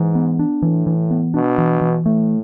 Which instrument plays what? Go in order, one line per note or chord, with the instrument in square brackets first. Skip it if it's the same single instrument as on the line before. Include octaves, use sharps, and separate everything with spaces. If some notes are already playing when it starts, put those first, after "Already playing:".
Already playing: [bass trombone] G#2 [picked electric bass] E3
[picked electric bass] B3
D4
[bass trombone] A2 [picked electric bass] E3
[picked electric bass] E3
B3
[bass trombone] B2 [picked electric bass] D4
[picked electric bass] E3
E3
[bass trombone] A2 [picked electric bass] A3